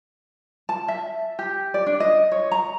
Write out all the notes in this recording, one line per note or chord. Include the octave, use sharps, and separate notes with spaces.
A5
E5
G4
D5
D4
D#5
C#5
A#5